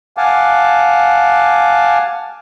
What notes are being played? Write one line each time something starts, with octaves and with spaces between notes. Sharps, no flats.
F5 F#5 G#5 A5 D6